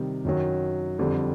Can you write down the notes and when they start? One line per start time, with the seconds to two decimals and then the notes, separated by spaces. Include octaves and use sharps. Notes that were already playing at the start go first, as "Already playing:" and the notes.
Already playing: C3 D#3 G3
0.25 F#2 D#3 F#3
0.99 F2 D3 G3